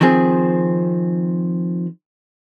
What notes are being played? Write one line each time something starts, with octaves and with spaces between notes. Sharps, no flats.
D#3 F3 C4 G#4